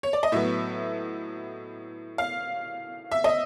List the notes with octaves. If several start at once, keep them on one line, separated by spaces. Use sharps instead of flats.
C#5
D5
D#5
A2 F#3 B3 E5
F5
E5
D#5